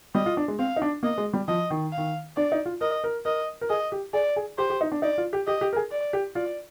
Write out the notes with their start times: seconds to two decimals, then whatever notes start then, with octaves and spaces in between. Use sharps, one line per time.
0.15 G3 D#5
0.26 F4
0.37 D4
0.48 G#3
0.59 C4 F5
0.76 D#4
0.82 D4
1.03 A#3 D#5
1.18 G#3
1.33 G3
1.48 F3 D#5
1.70 D#3
1.92 F5
1.97 D#3
2.37 D4 D5
2.52 D#4
2.65 F4
2.81 A#4 D#5
3.04 A#4
3.25 A#4 D#5
3.61 A#4
3.69 G#4 D#5
3.92 G4
4.13 G#4 D5
4.36 G#4
4.58 G4 C5
4.70 G4
4.81 D#4
4.92 D4
5.02 D#4 D5
5.18 F4
5.33 G4
5.47 G4 D#5
5.61 G4
5.73 A#4
5.76 G#4
5.91 D5
6.13 G4
6.35 F4 D5